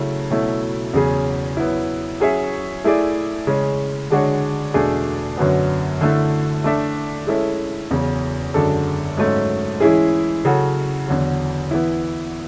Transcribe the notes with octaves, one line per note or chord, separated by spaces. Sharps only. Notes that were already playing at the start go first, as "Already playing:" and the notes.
Already playing: C#3 F#3 A3 E4
B2 F#3 A3 E4
E2 C#3 F#3 C#4 G#4
F#3 B3 E4
F#3 C#4 G#4 C#5 E5
A3 E4 G#4 D5
C#3 G#3 C#4
D3 G#3 D4 F#4 C#5
E2 B2 A3 D4 G#4
F#2 D3 F#3 B3
D3 A3 E4
A3 D4 A4 E5
G#3 C#4 E4 A4 E5
E2 C#3 F#3
F#2 D3 G#3 D4 A4
G#2 F#3 A3 C#4
E3 G#3 C#4 E4 G#4
C#3 F#3 C#4 F#4 A4
E2 D3 F#3
E3 B3 E4